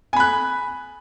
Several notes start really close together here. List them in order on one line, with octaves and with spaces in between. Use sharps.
G#5 B5 F#6